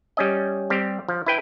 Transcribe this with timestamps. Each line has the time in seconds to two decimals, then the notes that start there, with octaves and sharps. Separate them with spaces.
0.17 G3 C#4 D#5
0.70 G3 C4 G4
1.08 F3
1.26 E4 B4 G5